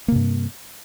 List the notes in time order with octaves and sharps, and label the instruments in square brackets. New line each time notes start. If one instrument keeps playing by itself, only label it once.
[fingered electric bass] A#3
C3
G2